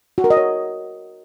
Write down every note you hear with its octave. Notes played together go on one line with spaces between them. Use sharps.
F#4
A#4
D#5
C#5